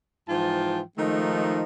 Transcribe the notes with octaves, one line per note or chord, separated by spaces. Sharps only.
G#2 E3 F3 F4 G5 A5
D#3 F3 G#3 A3 D#4